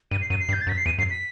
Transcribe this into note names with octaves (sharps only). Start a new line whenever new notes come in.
G2 D#7
C7
F#2 D#7
C7
G2
G6
A6
F#2
B6
C7
E2 D#7
F#2 C7
B6